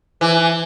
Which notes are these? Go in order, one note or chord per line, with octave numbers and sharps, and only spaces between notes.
E3